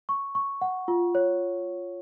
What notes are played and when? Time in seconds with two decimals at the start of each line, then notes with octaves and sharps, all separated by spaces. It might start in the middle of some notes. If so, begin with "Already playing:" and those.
0.09 C#6
0.35 C#6
0.61 F#5
0.88 F4
1.15 C#5